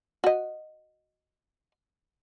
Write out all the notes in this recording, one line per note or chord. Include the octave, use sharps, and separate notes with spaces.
F#4 D#5